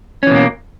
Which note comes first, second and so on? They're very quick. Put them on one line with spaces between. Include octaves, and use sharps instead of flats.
C#4 E3 B2 A#3